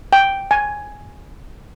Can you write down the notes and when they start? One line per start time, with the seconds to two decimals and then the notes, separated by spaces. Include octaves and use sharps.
0.13 G5
0.51 G#5